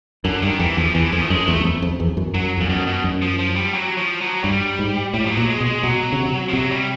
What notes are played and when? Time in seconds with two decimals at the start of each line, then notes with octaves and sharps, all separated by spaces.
0.25 F#2 D3
0.42 G2 D#3
0.59 F2 E3
0.77 E2 F3
0.95 E2 E3
1.12 F2 F3
1.22 A3
1.29 F#2 G#3
1.47 E2 A3
1.60 F#2
1.64 F2
1.82 F2
2.00 E2
2.17 F#2
2.34 F#2 F#3
2.58 F2 A#2
2.69 F#2 B2
2.87 B2
3.04 F#2
3.22 F3
3.39 F3
3.56 G3
3.74 F#3
3.97 F3
4.21 F#3
4.44 G2 G3
4.79 G#2
5.14 A2 G3
5.26 F3
5.31 F#3
5.37 A#2
5.49 G#3
5.61 B2
5.66 G#3
5.83 B2 F#3
6.12 C#3
6.19 C3
6.49 F3
6.53 C3 F#3
6.71 G3